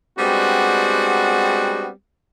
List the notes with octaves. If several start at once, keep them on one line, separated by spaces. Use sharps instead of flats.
G3 G#3 B3 C4 D4 F#4